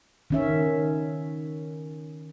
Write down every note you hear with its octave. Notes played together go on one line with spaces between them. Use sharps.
D#3 C#4 E5